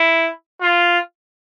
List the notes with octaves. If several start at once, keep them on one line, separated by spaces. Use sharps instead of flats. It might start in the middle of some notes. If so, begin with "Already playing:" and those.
Already playing: E4
F4